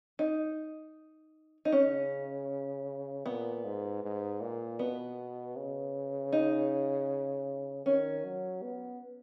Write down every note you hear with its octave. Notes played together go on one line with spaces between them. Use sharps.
D#4
D#4
C#3 C#4
A#2 B3
G#2
G#2
A#2
B2 B3
C#3
D#4
D#3 C#4
F#3
B3